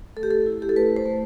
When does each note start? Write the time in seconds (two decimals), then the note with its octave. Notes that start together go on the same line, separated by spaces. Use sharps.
0.17 A3 A4
0.23 G4
0.31 A4
0.46 E4
0.62 G4
0.69 A4
0.76 A3 B4
0.96 C5
1.06 A3